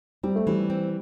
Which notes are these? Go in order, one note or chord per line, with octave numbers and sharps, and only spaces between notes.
G3 C4
A3
E3 G3
C4